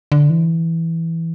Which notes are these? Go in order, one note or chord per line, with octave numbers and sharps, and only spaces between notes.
D3
E3